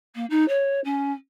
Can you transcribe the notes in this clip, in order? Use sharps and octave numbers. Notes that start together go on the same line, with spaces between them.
A#3
D#4
C#5
C#4